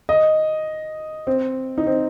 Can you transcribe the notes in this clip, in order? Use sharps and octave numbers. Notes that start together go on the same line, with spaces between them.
D#5
C4
D#4
C4